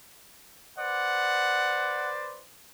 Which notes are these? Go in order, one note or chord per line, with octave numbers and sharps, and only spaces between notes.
B4 C5 D5 F#5